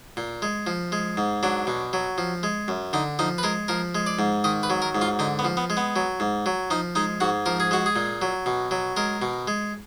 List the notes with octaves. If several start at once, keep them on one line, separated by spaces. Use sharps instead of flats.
A#2
G#3
F3
G#3
G#2
F#3 D4
B2
F#3
F3
G#3
F#2
D3 D#4
F3 D#4
B4
G#3 A#4
F3 A#4
G#3
D5
G#2
D#3 D#5
B4
F#3
A#4
G#2
F4
D3 D#4
B3
F3
B3
G#3
B3
F#3
G#2
F#3
F3 D#4
G#3 D#4
G#2 F#4
F3 A#4
G#4
G#3 F#4
G#4
A#2
F#3
B2
F#3
G#3 A#4
B2
G#3